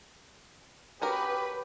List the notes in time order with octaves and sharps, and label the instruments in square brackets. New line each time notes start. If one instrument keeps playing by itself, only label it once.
[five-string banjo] C#4 F#4 A#4 [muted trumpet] G4 [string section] B4